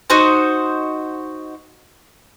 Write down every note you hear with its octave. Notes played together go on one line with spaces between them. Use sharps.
D#4 F#4 C5